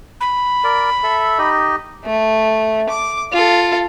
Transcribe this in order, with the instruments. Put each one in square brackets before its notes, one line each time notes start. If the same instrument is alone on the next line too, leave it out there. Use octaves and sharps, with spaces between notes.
[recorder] B5
[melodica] A#4 D5
A4 E5
D#4 G4 D#5
[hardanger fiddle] A3
D6
F4 A4